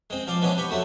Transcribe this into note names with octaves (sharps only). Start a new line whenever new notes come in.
G#3 C4
F3 F4 D5
E3 G#3 B3 C#4 D4
G4 B5 C#6
C3 F#3 A3 F#4